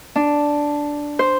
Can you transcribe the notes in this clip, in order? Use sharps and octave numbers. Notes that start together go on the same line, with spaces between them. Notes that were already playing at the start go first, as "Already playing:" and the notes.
D4
C5